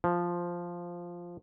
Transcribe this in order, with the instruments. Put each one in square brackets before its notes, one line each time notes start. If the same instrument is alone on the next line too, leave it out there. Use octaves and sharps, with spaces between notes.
[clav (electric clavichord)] F3